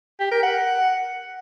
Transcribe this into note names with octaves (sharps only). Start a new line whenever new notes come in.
G4
A#4
F#5